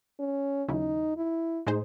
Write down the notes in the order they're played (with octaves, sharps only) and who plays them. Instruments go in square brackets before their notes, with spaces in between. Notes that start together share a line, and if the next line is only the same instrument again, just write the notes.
[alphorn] C#4
[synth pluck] D#2 C#3 F#3 C#4 E4 [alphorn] D#4
[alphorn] E4
[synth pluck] A2 G#3 D#4 G#4 C5